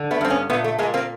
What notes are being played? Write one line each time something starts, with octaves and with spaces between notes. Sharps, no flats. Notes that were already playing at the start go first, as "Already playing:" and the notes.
Already playing: D3
A3 B3
G2 C4
B3 C#4
A#2 A3 B3
A3
A#2 G#3 A#3
A#3 C4